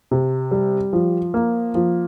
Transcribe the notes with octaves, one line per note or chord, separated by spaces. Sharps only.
C3
G3
F3
A#3
F3